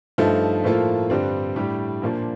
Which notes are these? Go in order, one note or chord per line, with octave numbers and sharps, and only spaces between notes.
G2 F3 A3 D#4 A4
A2 F3 A#3 F4 A4
G2 D3 G3 C4
A2 G3 D4 G4
A#2 F3 A#3 D4